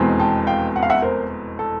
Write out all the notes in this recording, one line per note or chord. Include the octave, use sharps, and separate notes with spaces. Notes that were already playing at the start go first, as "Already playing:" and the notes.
Already playing: F1 E2 B2 G#3 C4
G5 A5
F5 G5
F#5
F5
E5 F#5
A#4 C5
A4